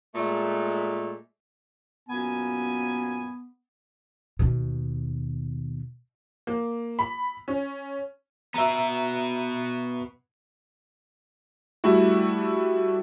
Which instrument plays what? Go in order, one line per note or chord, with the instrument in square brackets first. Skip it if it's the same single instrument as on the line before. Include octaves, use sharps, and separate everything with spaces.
[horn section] A#2 G#3 A3
[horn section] F#2 A#2 G#5 [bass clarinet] B3
[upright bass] D#2 B2
[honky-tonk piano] A#3
B5
C#4
[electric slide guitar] B3 F#4 [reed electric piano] E5 A#5
[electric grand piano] G3 A3 E4 F#4